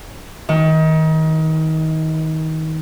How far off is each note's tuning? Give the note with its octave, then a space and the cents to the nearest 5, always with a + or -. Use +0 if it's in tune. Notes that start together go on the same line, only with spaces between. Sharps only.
D#3 +30